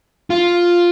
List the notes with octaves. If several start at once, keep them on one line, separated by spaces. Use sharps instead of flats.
F4